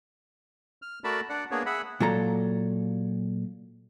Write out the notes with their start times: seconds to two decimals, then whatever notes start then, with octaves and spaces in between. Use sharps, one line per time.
0.82 F6
1.04 A3 F#4 A#4 D5 A5 B5
1.29 D4 D5 F#5
1.51 A#3 B3 D4 G#4 C#5
1.66 G#4 E5 F#5 B5
2.00 A#2 F#3 A4 A#5